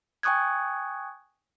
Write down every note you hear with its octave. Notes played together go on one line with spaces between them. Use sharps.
G5 G#5 C#6 D#6 F#6 G#6